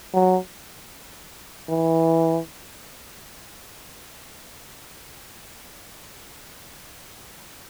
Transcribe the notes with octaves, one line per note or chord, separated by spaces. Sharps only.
F#3
E3